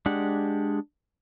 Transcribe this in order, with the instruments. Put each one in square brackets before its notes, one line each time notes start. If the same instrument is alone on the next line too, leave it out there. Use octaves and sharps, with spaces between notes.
[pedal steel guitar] G#3 D4 G4 F#5